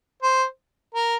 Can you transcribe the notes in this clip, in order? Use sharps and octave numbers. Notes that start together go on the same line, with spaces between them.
C5
A#4